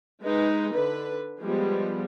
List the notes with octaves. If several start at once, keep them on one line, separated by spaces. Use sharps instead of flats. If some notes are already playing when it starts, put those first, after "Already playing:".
G#3 D#4 B4
D3 B4
F3 G3 G#3 B3